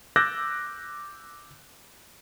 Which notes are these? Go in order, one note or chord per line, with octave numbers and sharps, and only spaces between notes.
D6 E6 F#6 G6 A6 A#6